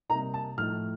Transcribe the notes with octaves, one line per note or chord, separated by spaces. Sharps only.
C3 G3 A#3 D#4 A#5
A5
A2 F3 A3 D#4 F6